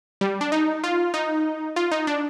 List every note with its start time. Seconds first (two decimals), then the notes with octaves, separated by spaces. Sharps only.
0.21 G3
0.41 D4
0.52 D#4
0.84 F4
1.14 D#4
1.76 F4
1.91 D#4
2.07 D4